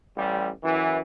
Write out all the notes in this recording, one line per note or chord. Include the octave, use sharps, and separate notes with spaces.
A1 G3
F#2 E3